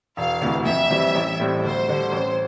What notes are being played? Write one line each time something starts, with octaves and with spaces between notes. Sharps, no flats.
E1 F5
D2 C3 E3
F2 E5
E3 G3 C4 E4
A1
A2 G3 C4
D2 C5
D3 G3
A1